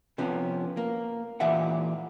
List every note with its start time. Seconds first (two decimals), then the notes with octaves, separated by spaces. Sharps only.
0.18 C3 F3 B3 C#4
0.77 A#3
1.40 A#2 E3 G4 E5 F#5